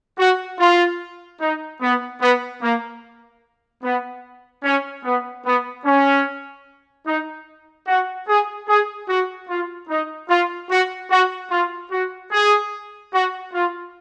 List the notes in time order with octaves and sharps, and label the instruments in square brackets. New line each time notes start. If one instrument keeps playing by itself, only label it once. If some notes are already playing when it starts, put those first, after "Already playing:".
[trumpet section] F#4
F4
D#4
B3
B3
A#3
B3
C#4
B3
B3
C#4
D#4
F#4
G#4
G#4
F#4
F4
D#4
F4
F#4
F#4
F4
F#4
G#4
F#4
F4